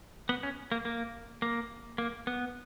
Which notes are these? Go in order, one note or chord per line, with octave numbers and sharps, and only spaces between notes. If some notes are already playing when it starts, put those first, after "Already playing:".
B3
C#4
A#3
A#3
A#3
A#3
B3